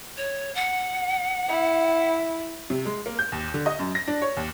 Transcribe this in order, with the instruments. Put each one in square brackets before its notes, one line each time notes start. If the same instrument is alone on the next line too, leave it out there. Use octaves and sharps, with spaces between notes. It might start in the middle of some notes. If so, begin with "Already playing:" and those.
[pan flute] C#5
F#5
[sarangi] E4
[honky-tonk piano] C3
G#3
A#3
G6
D#2
D3
D#5
F#2
A#6
D4
C#5
D#2